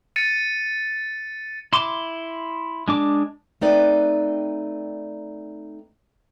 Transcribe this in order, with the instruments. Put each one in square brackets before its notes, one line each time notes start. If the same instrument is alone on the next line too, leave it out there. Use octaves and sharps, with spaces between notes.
[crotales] A6 C#7 D#7
[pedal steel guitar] E4 C6 D6
G#3 D4 D6
[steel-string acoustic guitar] A3 C4 D#4 B4 D5 G5